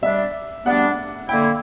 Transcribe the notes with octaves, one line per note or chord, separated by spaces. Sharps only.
G3 B3 D4 E5
G3 B3 D4 F#5
D3 A#3 E4 G5